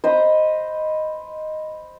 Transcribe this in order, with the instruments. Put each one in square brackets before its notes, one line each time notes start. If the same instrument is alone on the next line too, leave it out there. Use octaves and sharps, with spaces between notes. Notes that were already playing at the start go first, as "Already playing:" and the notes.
[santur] C5 D#5 A#5 B5